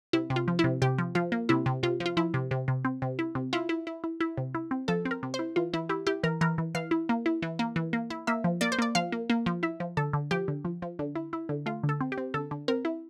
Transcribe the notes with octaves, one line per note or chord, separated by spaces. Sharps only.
C3 E4
C3
F4
F3
E4
C3
C3 G4
F3
F3 F4
A#3
C3 E4
C3
C3 F4
F3
F4
F3 E4
C3
C3
C3
C4
C3
E4
C3
E4 F4
E4
E4
E4
E4
C3
E4
C4
F3 A4
C4
A#4
C3
C5
E4
E3 F4
E3 E4
E4 G4
E4 G4
E3 A#4
E3 A#4
E3
E3 F5
E4
A#3
E4
E3
A#3
E3
A#3
E4
A#3 E5
F3
A#3 D5
C5
A#3 D5
F3 F5
A#3
A#3
F3
E4 E5
F3
D3 A4
D3
F3 G4
D3
F3
F3
D3
E4
E4
D3
A3 F4
D3
A4
C4
G4
C4
D3 A4
D3
C4 A#4
E4